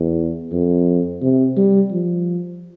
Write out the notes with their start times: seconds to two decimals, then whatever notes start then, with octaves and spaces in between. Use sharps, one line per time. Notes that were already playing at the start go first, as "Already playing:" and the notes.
Already playing: E2
0.52 F2
1.22 C3
1.57 G3
1.92 F3